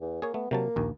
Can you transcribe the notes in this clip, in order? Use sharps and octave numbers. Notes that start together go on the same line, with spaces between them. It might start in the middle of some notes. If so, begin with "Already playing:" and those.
E2
A#3 G#4 C#5
A3 B3
C3 F#3 A#3 A5
A#1 D#2